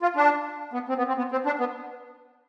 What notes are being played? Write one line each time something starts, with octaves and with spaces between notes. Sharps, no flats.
F4
D4
B3
C4
B3
C4
B3
C4
D4
B3